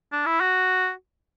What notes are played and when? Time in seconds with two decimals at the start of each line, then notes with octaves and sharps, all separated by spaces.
0.12 D4
0.26 E4
0.41 F#4